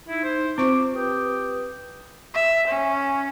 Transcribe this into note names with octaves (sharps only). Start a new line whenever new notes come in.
D#4 E4
C5
C4 F4 C5 C#6 D6
G4 B4 D#6
E5
C#4